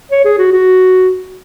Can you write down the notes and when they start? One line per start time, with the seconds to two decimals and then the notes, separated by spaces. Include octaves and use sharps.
0.11 C#5
0.25 G#4
0.38 F#4
0.52 F#4